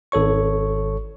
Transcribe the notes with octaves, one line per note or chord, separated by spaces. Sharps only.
G#1 A4 C#5 C#6